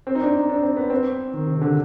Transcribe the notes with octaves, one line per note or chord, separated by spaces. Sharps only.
C4
D#4
D4
D#4
D4
C4
B3
C4
D#3
C3
D3